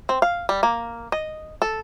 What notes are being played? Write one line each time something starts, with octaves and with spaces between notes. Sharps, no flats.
C4
F5
G3
A#3
D#5
A4